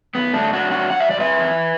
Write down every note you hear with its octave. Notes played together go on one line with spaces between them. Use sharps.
F#2 B3
A3 D4
F#2
D4 F#4
F#3
D4 F#4
F#2 F#5
E5
D5
F#2 B4 E5
E3